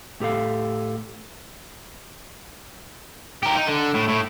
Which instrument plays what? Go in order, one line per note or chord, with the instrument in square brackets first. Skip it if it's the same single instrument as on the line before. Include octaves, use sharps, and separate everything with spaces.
[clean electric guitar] A2 G4 A4 F5
[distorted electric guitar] G4 A#4
D#4
D3
A2
A2